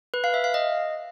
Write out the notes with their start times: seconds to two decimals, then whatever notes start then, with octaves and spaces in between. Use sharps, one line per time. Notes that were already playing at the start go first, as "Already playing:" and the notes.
0.14 B4
0.24 F5
0.34 E5
0.44 F5
0.54 D#5